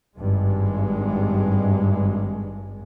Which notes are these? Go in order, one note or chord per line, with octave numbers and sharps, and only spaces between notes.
G#1 G2 G#3